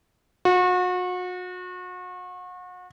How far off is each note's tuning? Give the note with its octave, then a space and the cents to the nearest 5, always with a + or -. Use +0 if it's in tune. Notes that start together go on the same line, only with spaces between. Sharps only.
F#4 -35